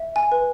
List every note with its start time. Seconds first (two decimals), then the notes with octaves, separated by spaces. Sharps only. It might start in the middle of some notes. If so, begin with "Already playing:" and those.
Already playing: E5
0.16 G#5
0.32 B4